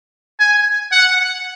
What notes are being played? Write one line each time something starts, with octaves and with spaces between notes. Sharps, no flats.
G#5
F#5